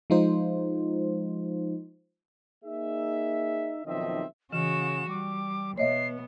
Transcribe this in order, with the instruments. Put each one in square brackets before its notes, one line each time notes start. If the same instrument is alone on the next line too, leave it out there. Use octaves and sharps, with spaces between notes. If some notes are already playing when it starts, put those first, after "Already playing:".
[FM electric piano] F3 G#3 D#4 F4 C5
[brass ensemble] A#3 D#4 G#4 E5
B1 D#3 F3 C4 D#5 E5
[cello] C#3 F#4 [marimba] E3 [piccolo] E7
[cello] G3 [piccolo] D6
[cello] B2 B3 [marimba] C#5 D#5 E5 [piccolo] C7